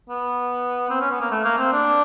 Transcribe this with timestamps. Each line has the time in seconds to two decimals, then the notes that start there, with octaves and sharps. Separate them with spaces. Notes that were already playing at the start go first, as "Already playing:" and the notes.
0.09 B3
0.90 C4
1.00 C#4
1.11 B3
1.20 A#3
1.31 A3
1.44 A#3
1.58 C4
1.72 D4